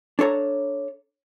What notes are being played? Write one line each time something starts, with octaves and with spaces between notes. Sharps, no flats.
D4 A4 C#5 A#5